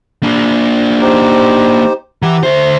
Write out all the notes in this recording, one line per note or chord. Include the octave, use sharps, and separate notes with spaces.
A#3 D4
D#4 G4 C5
E3 G4 F#5 A#5
D2 A3 C5